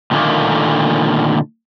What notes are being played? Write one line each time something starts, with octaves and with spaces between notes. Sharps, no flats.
A#2 D3 D#3 A3 A#3